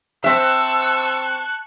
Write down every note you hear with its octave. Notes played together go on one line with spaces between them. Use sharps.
C4 E5 A5 C#6 E6 F#6